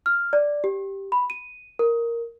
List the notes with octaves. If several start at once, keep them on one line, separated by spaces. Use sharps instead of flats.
F6
D5
G4
B5
D#7
A#4